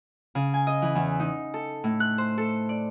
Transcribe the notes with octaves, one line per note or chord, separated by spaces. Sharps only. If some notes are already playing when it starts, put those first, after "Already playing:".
C#3
G#5
D#5
E3
E2
D#4
A4
A2
F#6
C5
A4
D5